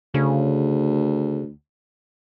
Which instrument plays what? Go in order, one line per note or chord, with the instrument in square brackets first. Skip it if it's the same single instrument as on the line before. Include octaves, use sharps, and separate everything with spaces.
[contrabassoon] D2 [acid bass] C#3